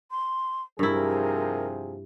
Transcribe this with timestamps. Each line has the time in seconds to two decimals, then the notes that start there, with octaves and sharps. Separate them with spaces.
0.11 C6
0.79 G2 C3 F3 E4 G#4 A#4